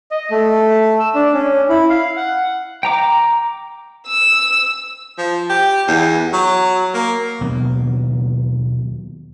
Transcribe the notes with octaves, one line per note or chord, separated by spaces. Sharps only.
D#5
A3
E6
D4
C#4
E4
F5
F#5
G5 A#5 D6
E6
F3
G4
E2
F#3
A#3
D#2 B2 F#3 B3